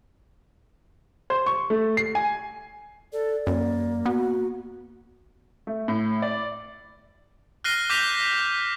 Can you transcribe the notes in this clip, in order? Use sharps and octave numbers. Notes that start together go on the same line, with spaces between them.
C5
C#6
A3
C7
G#5
A4 D5
F#2 A#3
B3 F#4
A3
A2
D5
F6 F#6 A#6 C7 D#7 G7
D6 G6 A#6 B6 D#7 F7
A#6